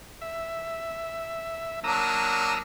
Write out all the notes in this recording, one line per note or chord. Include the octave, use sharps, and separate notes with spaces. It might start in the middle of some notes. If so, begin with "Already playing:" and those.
E5
F#3 A#3 D4 A#5 D#6 E6